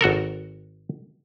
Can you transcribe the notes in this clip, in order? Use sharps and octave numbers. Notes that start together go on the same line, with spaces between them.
G#1 F#4 A4 A#4